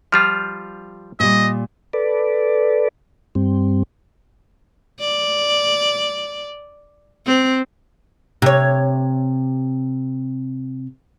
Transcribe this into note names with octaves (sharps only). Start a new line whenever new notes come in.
F3 G3 F4 F6
A#2 G3 D#5
A4 B4 D5
G2 G3 C4
D5
C4
C3 C#5